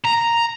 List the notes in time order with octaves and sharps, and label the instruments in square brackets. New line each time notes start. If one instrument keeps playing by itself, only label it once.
[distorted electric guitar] A#5